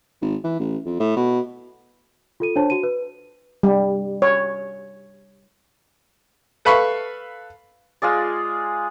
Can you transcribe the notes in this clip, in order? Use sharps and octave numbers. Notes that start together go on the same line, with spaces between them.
G#1
E3
A1
F2
A2
B2
F4 A4 D#7
D4 C5 C#5 A5
F#4 D#7
B4
G3
C#5
A4 B4 F5 B5 C#6
G#3 F4 G#4 D5